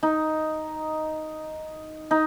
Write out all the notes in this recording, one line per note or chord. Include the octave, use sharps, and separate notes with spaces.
D#4
D#4